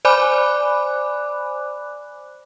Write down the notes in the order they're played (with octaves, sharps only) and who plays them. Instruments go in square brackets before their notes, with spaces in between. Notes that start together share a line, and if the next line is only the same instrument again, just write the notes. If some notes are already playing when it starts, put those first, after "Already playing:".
[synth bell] C5 D5 G#5 B5 D6 F#6